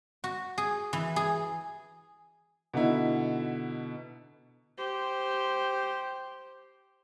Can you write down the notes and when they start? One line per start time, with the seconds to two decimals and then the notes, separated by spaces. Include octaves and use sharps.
0.24 F#4
0.58 G#4
0.93 E3
1.16 G#4
2.74 B2 D3 D#4 E4
4.77 G4 C5